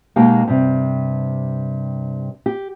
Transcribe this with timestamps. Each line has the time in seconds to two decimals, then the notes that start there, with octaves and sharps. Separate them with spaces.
0.16 B2 G#3 A#3 D#4 G4 G5
0.47 G2 C3
2.46 G4